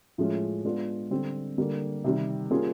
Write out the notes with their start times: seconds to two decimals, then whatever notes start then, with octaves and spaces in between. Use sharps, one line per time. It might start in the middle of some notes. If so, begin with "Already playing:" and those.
0.18 A2 F3 G#3 C#4
0.65 G#3 B3 D4 F4 G#4
1.11 D3 G3 C4
1.58 D3 G3 A#3
2.04 C3 D#3 G3
2.51 G3 A#3 C#4 F4 G#4